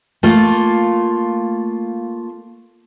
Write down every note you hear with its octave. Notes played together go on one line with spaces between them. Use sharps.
A3 A#3 F4